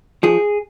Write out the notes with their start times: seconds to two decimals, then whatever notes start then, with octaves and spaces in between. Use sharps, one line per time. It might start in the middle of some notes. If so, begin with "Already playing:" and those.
0.23 F3 G#4